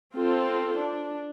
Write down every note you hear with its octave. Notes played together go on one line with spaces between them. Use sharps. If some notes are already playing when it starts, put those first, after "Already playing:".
C4 F4 A4 C5
D4